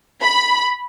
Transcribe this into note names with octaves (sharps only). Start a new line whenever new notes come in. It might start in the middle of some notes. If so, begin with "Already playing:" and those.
B5